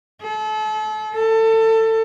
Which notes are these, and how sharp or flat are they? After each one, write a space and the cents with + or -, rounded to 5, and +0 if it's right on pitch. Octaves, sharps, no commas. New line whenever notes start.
A4 -35
A4 +25